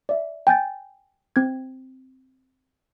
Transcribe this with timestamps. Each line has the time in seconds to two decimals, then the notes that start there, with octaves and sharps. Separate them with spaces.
0.09 D5 E5
0.47 G5 G#5 G6 A6
1.36 C4 G#6